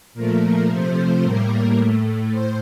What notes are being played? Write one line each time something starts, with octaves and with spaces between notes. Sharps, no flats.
A#2 F3 A3 A#4
C3 F3 A3 C5
A2 G3 A#3 A#4
A2 A3
A2 C5